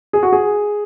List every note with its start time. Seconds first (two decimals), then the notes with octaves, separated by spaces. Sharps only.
0.13 G#4
0.23 F#4
0.32 G#4